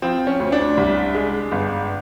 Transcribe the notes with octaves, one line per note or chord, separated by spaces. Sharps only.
F3 C4
C#4
D2
D4
C2
G#3
G1